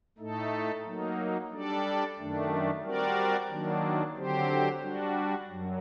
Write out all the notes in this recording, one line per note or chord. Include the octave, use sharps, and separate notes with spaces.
A2 A3 D#4 A4
F#3 A#3 D#4
G3 D4 A4 D5
F#2 D#3 A3 D4
G3 C4 F#4 A#4 D5
D#3 F#3 A#3 D4
D3 F#3 C4 G4 C5
G3 D4 F#4
F#2 F#3